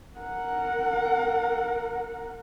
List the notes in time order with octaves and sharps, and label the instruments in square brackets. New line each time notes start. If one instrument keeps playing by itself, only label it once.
[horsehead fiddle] A#4 F#5